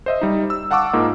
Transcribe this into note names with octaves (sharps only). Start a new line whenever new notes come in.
C5 D#5 E5
G3 D#4
E6
F5 F#5 A5 C#6 D6 E6
G#2 A#3 D#4 F4